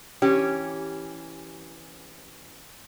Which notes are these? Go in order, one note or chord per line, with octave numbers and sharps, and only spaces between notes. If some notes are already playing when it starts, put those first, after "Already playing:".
E3 C#4 G4